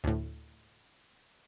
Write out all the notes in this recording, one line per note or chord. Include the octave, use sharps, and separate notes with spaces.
D2 A2